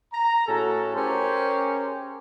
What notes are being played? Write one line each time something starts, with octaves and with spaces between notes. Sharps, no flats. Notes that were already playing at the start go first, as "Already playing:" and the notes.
A#5
A2 C#4 F#4 G#4 A4
C#4 G4 G#4 A#4 C5